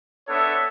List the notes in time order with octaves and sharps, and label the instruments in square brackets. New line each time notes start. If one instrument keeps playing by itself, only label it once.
[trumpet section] B3 D4 A4 C#5 E5